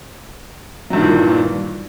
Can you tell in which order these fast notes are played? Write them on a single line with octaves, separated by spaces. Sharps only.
F#3 G2 D#3 A#2 E3